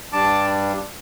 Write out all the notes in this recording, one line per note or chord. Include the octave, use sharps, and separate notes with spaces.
G2 G3 D4 A5 D6